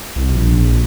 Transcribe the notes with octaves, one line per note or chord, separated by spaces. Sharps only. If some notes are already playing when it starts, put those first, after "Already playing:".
C2
A#1